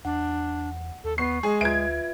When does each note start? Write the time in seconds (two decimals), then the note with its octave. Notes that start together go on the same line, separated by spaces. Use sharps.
0.05 E2 D4 F#5
1.04 D#2 A4
1.18 B3 C#6 C7
1.43 G#3 G#4
1.61 D2 F4 B4 E5 G#6 D7